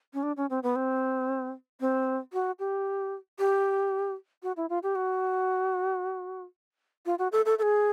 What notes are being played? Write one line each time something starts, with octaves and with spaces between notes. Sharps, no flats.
C#4
D4
C#4
C4
B3
C4
C4
F#4
G4
G4
F#4
E4
F4
G4
F#4
F4
F#4
A4
A4
A4
G#4